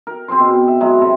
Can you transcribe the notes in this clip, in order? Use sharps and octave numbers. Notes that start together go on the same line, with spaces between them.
A#4
C4 G#4 C5 C6
B2 G5
E5
F#3 G#3 E4 A#5
C3 A4